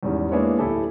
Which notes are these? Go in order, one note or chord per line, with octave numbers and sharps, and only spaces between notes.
E2 G#2 D#3 G3 C#4
G#3 A#3 B3 D4 E4 C#5
D1 E4 G4 A4 G#5